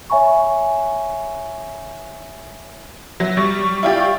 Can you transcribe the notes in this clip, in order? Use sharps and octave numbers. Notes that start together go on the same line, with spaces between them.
C#5 E5 G#5 B5 C#6
F#3 E5
G3 C#6
E4 F4 G4 D5
C#6